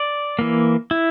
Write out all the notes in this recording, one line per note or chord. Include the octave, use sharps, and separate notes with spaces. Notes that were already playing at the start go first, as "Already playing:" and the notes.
Already playing: D5
E3 A#3
E4